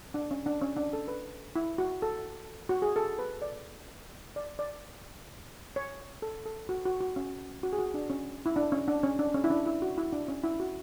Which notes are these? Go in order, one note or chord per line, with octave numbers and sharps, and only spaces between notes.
D4
C#4
D4
C#4
D4
A4
B4
E4
F#4
A4
F#4
G#4
A4
B4
D5
D5
D5
C#5
A4
A4
F#4
F#4
F#4
C#4
F#4
G#4
F#4
D4
C#4
E4
D4
C#4
D4
C#4
D4
C#4
E4
D4
E4
F#4
E4
D4
C#4
E4
F#4